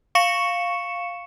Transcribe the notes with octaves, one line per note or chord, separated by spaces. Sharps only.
F5 C#6 C#7 E7